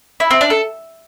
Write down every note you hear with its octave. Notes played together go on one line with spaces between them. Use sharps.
E4
C4
D4
A4